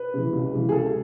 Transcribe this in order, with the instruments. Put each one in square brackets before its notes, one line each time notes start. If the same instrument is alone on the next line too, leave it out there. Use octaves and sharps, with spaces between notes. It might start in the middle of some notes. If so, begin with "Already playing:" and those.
Already playing: [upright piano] B4
C#3 E3
C#2
C#3 E3
G#4
C#2 A4